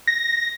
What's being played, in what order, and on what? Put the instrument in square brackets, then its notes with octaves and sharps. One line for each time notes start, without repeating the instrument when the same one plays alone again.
[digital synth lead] A#6